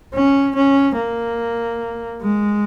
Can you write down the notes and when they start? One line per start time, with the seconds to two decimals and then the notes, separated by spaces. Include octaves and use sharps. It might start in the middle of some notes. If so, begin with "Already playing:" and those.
0.14 C#4
0.55 C#4
0.96 A#3
2.22 G#3